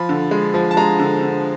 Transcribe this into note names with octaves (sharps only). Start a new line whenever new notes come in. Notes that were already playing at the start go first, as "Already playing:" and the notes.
Already playing: F3 B5
D3
G#3
F3
A5
G#3 A#5
D3
D3